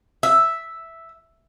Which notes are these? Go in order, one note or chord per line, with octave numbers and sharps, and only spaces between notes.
E5